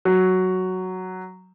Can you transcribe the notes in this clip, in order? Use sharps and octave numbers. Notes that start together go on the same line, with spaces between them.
F#3